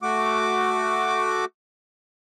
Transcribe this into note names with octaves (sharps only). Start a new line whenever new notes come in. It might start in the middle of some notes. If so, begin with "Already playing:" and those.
A3 F#4 D6